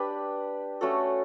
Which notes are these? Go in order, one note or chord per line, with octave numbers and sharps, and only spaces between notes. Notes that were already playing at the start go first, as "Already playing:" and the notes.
Already playing: D4 G4 B4
A3 C#4 F#4 A4